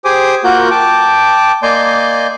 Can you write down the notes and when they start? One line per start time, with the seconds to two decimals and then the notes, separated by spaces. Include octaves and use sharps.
0.05 G4 G#4 C5 G#5 D6 D#6
0.44 A#3 F4 F#4 A#4 F#5 G6
0.71 G5 A5 D6
1.63 A#3 D5 D#5 G#5 C6 G6